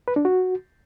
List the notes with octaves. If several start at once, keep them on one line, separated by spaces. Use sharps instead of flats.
B4
D4
F#4